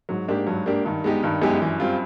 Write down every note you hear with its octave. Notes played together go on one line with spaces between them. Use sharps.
G#2 F#3
G#2 A#3 D4 G4
G2 F#3
A#3 D4 G4
G2 D#3
G#3 B3 D#4 G4
G2 D#3
F#2 G#3 B3 D#4 G4
E3
G3 C4 F4